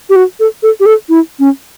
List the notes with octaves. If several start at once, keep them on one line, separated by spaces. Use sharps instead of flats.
G4
F#4
A4
A4
G4
A4
E4
C#4